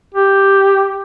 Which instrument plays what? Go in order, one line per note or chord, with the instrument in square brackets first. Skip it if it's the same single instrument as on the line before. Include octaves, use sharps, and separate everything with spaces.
[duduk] G4